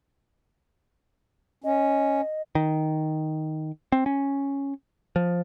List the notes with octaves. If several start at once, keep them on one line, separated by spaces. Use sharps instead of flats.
C#4 D#5
D#3
C4
C#4
F3